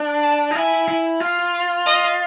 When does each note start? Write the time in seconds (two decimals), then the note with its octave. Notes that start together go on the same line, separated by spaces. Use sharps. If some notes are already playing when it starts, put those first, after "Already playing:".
Already playing: D4
0.23 A5
0.51 D#4
0.55 E4 G#5
0.88 E4
1.20 F4
1.86 D#5